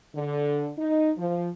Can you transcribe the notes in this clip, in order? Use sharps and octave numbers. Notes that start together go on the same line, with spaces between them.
D3
D#4
F3